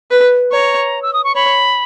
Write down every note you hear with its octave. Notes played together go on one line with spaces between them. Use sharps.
B4
C#5 A#5
E6
D#6
C#6
C#5 B5